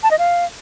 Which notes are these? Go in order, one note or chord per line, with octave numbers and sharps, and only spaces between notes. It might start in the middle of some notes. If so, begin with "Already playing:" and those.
A5
D#5
F5